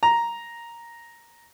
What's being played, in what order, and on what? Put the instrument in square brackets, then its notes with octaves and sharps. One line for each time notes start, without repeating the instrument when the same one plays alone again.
[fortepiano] A#5